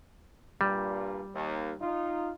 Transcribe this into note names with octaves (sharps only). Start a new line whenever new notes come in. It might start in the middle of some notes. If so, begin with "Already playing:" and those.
G2 A#2 G3
D#2
D#4 F4